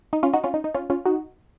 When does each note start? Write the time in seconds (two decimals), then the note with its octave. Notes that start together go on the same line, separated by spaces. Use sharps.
0.13 D#4
0.23 C#4 F4
0.33 D#4 F#4
0.44 C#4 F4
0.54 D#4
0.64 D#4
0.74 C#4 F4
0.90 C#4 F4
1.05 D#4 F#4